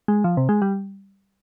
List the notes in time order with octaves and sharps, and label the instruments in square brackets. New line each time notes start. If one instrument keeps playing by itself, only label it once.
[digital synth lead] G#3
F3
C3
G#3
G3